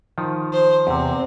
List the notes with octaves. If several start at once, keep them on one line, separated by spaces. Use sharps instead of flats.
D#3 F3
C5
E2 C3 C4